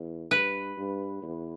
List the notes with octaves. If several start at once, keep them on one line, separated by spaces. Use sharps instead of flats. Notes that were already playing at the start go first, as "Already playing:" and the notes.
Already playing: E2
G2 B4
G2
E2